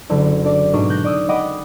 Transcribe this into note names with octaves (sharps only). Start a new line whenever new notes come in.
F#1 D3
D3 D4 D5 D6
G#2 B2 D4 C#6 D#7
F#6 G6 A#6
D5 D#6 E6
D#5 F#5 G5 B5 D6 D#6